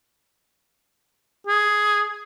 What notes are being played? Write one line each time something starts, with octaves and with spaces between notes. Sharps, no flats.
G#4